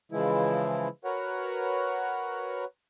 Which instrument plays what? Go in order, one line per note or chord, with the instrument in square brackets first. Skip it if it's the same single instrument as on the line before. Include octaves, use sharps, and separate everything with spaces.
[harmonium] C#3 E3 F3 G#3 E4
F#4 A#4 B4 C#5 F#5